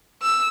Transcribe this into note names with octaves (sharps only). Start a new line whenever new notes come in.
E6